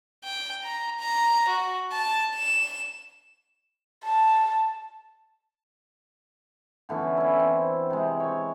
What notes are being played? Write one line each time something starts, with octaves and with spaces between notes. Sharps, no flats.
G5
A#5
A#5
F#4
A5
E7
A5
D3 E3 B3 C#4
C#4 E4
C4
C3 G#3
C#5 C#6